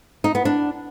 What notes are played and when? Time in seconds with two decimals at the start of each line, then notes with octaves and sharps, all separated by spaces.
0.24 D#4
0.35 B3
0.45 D4